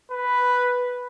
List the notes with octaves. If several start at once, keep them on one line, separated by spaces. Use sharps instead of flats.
B4